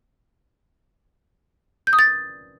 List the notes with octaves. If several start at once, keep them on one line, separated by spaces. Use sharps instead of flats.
G6
D#6
A6